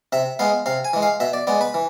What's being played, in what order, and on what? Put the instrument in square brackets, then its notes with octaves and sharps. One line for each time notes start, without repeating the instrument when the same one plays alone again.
[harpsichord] C3 E5
G#3 B3 F5
C3 F5
G#5
E3 G#3
F5
B2 E5
D5
G#3 B3 D5
B4
E3